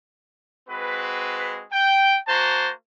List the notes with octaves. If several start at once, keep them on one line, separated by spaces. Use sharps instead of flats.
G#3 C4 F#4 B4
G5
A#3 F#4 C5 A5 A#5